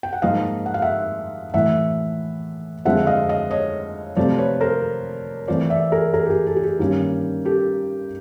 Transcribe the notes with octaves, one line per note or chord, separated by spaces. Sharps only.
G5
F#5
G#2 F3 A#3 D#4 D#5 F5
F#5
F5
E5 F#5
A2 E3 A3 E5 F#5
F2 D3 F3 G#3 C4 E5 F#5
D#5 F5
D#5 F5
C#5 D#5
C3 F3 A3 C5 D5
B4 C#5
A#4 C5
E3 A3 C4 F4 C5 D5
D5 E5
G#4 A#4
G#4 A#4
G4
G#4
G4 A4
G#4
G4
G2 D#3 G3 A#3 C#4
G4 A4